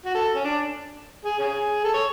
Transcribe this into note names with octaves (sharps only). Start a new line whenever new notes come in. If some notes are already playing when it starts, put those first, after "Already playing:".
F#4
A4
C#4
D4
G#4
C#4 G#4
A4
C#5